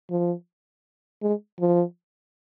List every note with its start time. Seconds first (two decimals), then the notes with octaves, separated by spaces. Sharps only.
0.10 F3
1.22 G#3
1.60 F3